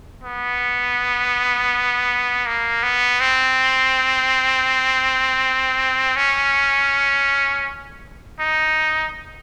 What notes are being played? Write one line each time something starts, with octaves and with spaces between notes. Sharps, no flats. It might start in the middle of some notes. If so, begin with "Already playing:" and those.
B3
A#3
B3
C4
C#4
D#4